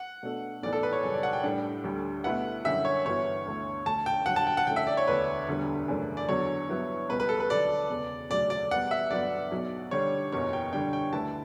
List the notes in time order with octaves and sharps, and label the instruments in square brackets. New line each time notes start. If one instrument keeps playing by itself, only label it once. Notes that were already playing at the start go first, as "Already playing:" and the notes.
Already playing: [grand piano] F#5
[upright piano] B2 A3 D4 F#4 A4
[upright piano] B1 A2 E3 B3 [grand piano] D5
[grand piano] A4
B4
C#5
[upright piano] F#2 C#3 G3
[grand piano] D5
F#5
G5
[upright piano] A2 G3 D4
D2 D3 G3
[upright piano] B2 A3 E4 B4 E5 [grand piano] F#5
[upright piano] F#2 D3 G3 C#4 G4 [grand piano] E5
[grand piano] C#5
[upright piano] G1 G2 E3 B3 F#4 [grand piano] C#5
[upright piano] D2 D3 A3
[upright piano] D2 D3 A3 [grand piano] A5
[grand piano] G5
[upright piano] G2 D3 F#3 [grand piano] F#5
[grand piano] A5
G5
F#5
[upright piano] D3 A3 C#4 E4 A4 [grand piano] G5
[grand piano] E5
D5
C#5
[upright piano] E1 D2 D3 [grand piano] B4
[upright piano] E1 D2 D3 G3 D4
F#2 C#3 E3 A3 D4
[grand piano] D5
[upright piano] E2 D3 F#3 [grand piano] C#5
[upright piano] G2 F#3 B3 E4
[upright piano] C#2 B2 G3 [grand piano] B4
[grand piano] B4
A4
B4
[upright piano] D2 D3 F#3 [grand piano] D5
[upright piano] E1 E2 C#3
[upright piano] D2 C#3 F#3 A3 [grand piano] D5
[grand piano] D5
[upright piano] E2 B2 G3 B3 [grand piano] F#5
[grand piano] E5
[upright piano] G1 G2 F#3 B3 D4 [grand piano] D5
[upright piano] B1 B2 F#3
[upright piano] D3 G3 D4 [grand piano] C#5
[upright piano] F#1 E2 B2 [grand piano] C#5
[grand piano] G5
[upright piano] D3 G3 D4 [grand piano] G5
[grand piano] G5
[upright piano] D2 D3 A3 E4 B4 [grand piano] A5